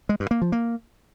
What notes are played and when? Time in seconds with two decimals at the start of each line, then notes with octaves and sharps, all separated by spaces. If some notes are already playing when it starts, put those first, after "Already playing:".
0.09 G#3
0.20 G2
0.31 A#3
0.42 F3
0.52 A#3